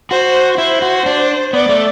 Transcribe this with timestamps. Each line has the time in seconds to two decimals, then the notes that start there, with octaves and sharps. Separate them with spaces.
0.10 F#4 C5
0.58 E4 C5
0.82 F#4
1.06 D4
1.53 B3 D5
1.69 A3